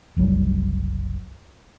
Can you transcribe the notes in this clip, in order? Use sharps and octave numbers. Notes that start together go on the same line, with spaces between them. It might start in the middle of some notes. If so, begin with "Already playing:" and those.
F#1 C2 F#3 G3